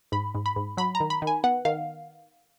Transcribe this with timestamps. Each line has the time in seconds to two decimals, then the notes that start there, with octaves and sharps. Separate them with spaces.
0.12 G#2 B5
0.35 G#2
0.46 B5
0.56 G#2
0.77 F#3 B5
0.95 A#5
1.00 D#3
1.10 B5
1.22 D#3
1.27 G#5
1.44 B3 F#5
1.65 D#3 F5